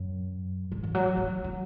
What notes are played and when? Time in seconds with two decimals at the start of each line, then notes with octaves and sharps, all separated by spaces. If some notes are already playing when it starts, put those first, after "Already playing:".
Already playing: F#2
0.72 G#2
0.83 E3
0.95 F#3
1.17 F#3
1.44 F#3